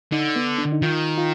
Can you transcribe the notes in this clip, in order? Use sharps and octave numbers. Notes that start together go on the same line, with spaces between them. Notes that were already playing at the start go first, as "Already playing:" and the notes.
D3 D#4
B3
D4
D#4
D#3 F4
F4